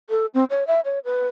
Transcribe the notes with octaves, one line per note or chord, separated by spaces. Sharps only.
A4
C4
C#5
E5
C#5
B4